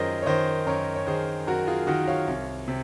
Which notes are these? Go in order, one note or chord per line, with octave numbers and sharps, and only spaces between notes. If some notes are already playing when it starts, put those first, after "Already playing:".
Already playing: F#2 D#3 F4 G#4 A#4 C5 C#5 D#5
C#5
D#3 C5 D#5
F#2 A#4 C#5
C#5
D#3 G#4 C5
F#2 F#4 A#4
F4 G#4
D#3 D#4 F#4
C#5 F5
C2
C3